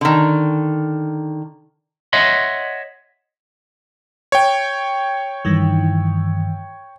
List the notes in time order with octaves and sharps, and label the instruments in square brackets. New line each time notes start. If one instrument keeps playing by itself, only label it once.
[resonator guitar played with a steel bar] D3 D#3
[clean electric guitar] C#5 D#5 E5 F#5 C6
[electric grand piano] C#5 G5
[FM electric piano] G2 D#3 E3